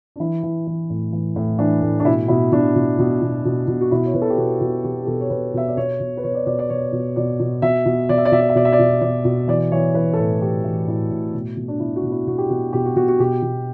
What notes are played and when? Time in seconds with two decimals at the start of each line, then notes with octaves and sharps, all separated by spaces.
0.16 D4
0.20 E3 E4
0.43 E3
0.67 E3
0.90 A2
1.13 E3
1.36 A2
1.59 E3 D4
1.82 A2
2.00 D4
2.05 B2 E4
2.28 B2 E4
2.52 B2 D4
2.76 B2
2.99 B2
3.22 B2
3.45 B2
3.68 B2
3.81 F#4
3.91 B2 E4
4.06 C#5
4.14 B2 B4
4.22 A4
4.30 G4
4.38 B2 F#4
4.61 B2
4.84 B2 G4
5.03 G4
5.07 B2 A4
5.21 C#5
5.30 B2 B4
5.54 B2 E5
5.68 D5
5.77 B2 C#5
6.00 B2
6.17 B4
6.23 B2 C#5
6.34 D5
6.46 B2 D5
6.59 D5
6.70 B2 C#5
6.92 B2
7.16 B2 D5
7.40 B2
7.62 B2 E5
7.86 B2
8.09 B2 D5
8.18 E5
8.25 D5
8.32 B2 E5
8.40 D5
8.49 E5
8.55 B2 D5
8.65 E5
8.73 D5
8.79 B2
9.01 B2 D5
9.25 B2
9.48 E3 D5
9.72 E3 C#5
9.94 E3 B4
10.14 A4
10.18 A2 B4
10.41 E3 G4
10.64 E3
10.87 A2 E4
11.11 A2
11.34 B2
11.57 B2
11.68 D4
11.80 B2 E4
11.96 F#4
12.03 B2
12.11 E4
12.27 B2 F#4
12.38 G4
12.50 B2 F#4
12.73 B2 G4
12.85 F#4
12.96 B2 F#4
13.08 F#4
13.20 B2 G4
13.42 B2